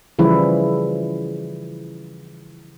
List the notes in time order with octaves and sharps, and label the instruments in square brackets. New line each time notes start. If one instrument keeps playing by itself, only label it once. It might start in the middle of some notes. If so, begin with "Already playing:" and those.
[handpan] C#3 E3 F3 G3 E4